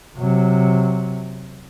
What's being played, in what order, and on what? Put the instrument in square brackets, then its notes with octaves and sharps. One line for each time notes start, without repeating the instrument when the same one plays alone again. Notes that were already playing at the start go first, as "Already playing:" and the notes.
[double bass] C3 F#3